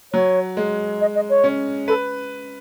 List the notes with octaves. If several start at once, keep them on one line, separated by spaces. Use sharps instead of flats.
F#3 C#5
G#3
D#5
D#5
C#5
C#4
A4 B4